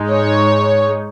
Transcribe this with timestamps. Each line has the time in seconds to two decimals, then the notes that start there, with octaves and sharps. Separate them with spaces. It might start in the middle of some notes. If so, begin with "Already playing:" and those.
Already playing: G#2 G#3 D#4
0.10 C#5